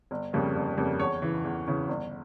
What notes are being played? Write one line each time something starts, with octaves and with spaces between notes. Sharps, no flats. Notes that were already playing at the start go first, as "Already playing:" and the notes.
G1
F2 C#3 G3 A#3
G1
F2 C#3 G3 A#3
E2 C#5
C#3 E3
E2
C#3 E3
G1